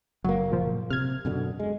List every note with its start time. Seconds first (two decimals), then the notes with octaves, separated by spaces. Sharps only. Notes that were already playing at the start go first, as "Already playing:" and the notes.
0.24 F#1 F#3 A#3
0.52 A#2 F3
0.90 C3 F6 G#6
1.25 F#2 B2 D3
1.60 G#3